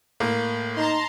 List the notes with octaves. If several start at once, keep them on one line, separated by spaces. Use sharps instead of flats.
A2 A#3
D#4 A5 A#5 C6